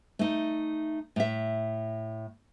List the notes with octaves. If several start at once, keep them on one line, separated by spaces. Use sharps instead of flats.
A3 D#4
A2 E5